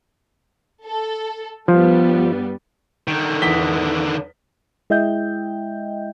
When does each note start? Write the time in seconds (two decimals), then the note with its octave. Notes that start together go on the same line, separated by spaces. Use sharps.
0.86 A4
1.68 G2 F3 G3 B3
3.08 D3 D#3
3.42 E2 B6 G7
4.90 G#3 E4 D#5 E5 G5 G6